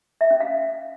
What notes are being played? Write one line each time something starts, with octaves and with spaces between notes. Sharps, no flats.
E5
C#4
F5